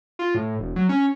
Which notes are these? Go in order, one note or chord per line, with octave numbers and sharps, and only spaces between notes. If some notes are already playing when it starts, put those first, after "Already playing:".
F4
A2
E1
F#3
C#4